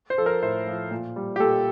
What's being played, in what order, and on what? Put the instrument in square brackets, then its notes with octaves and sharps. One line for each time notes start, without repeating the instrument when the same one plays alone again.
[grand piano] C5
F3 A4
A#4
A2 C5
F3
A#2
G3
G4
A#2 A4